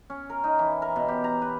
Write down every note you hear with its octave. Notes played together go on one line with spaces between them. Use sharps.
C#4
A#4
D#4
E3
A#4
B2
G4
A#5
B4